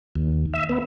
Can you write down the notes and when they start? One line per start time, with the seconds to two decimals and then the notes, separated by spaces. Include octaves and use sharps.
0.16 D#2
0.53 E5
0.69 B3